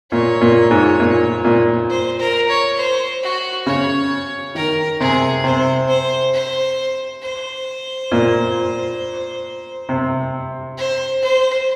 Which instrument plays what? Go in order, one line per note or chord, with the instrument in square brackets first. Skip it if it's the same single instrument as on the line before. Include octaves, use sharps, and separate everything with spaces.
[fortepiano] A#2 [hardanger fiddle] C#5
[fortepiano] A#2
G#2
A#2
A#2
[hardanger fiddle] C5
A#4
C#5
C5
F#4
[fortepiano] C#3 [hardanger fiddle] C#5
[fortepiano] D#3 [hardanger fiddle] A#4
[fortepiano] C3 [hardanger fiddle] G#4
[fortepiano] C3 [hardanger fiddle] C5
[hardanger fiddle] C5
C5
C5
[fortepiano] A#2
C3
[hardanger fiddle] C5
C5